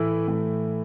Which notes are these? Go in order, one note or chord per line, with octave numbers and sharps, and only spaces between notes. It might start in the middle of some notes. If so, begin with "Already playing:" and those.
Already playing: A2 E3 A3 E4
A2 E3 A3 E4